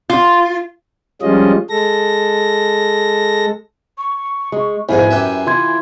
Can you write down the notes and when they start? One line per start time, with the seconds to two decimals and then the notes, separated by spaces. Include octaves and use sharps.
0.10 F4
1.22 F3 G3 G#3 C#4 F4 D#5
1.70 G#3 A4 A#6
3.98 C#6
4.52 G#3
4.89 A#1 G#2 B2 E4 G#5
5.11 F#2 G4 B4 E5
5.47 E3 F4 C6 G#6